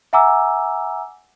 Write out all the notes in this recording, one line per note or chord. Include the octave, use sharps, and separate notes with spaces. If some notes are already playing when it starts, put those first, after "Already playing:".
E5 F#5 G#5 A#5 D6 E6